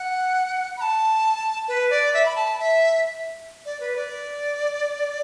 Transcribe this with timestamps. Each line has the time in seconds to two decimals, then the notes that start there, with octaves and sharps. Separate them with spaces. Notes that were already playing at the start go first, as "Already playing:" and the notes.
Already playing: F#5
0.77 B5
0.81 A5
1.68 B4
1.90 D5
2.14 E5
2.26 B5
2.36 A5
2.60 E5
3.65 D5
3.80 B4
3.96 D5